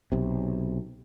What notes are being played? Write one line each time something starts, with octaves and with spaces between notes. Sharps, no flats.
B1 C3